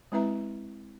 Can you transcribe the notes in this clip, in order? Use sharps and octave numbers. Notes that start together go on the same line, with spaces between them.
G#3 C4 E4 B4 E5 A#5